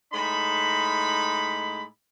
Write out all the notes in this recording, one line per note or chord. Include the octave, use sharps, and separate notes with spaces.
A2 G#3 D#4 B5